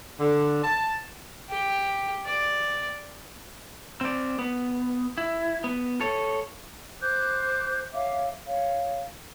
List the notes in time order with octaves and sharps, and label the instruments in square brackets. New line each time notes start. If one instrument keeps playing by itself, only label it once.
[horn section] D3
A5
[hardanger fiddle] G4
D5
[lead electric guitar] C4 D5
B3
E4
B3
A4 C#5
[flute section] C5 D6 F#6 G6
C#5 E5 F5 D6
C#5 F5